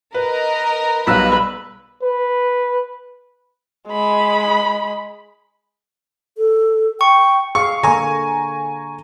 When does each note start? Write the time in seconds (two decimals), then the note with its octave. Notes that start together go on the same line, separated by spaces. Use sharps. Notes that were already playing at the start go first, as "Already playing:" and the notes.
0.14 A#4 B4 D#5 A#5
1.07 B1 G3 B4 F5 B5 E6 F#6
2.03 B4
3.87 G#3 B5
6.38 A4
7.01 G5 C#6
7.55 G#4 F5 C#6 C#7
7.83 D3 A#3 G#5 A#5 C#6